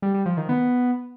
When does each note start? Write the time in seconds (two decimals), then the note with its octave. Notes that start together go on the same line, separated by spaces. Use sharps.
0.02 G3
0.14 G3
0.26 F3
0.37 D#3
0.49 B3